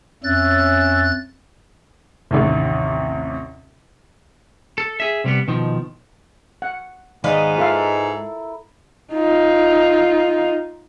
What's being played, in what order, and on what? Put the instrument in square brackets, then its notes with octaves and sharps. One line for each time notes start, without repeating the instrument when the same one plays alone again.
[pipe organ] F2 F#6 A6 [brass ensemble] C#4 E5
[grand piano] A1 D#2 C3
[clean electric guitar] A4
G#4 E5
C3 G3 B3
B2 D#3 F3
[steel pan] F#5
[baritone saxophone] G#2 [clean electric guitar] D#3 B3 F5 [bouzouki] B4 D#5 [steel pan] D5
[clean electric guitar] E4 A4 A#4 [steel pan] F4 E5 F5
[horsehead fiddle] D#4 F4